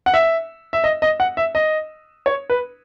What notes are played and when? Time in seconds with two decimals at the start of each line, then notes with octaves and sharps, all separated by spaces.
0.06 F#5
0.14 E5
0.73 E5
0.84 D#5
1.02 D#5
1.20 F#5
1.37 E5
1.55 D#5
2.26 C#5
2.50 B4